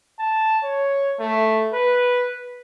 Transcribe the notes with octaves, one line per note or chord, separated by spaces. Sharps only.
A5
C#5
A3
B4